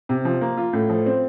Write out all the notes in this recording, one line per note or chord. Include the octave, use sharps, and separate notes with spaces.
C3
F3
A#3
F4
A2
F3
C4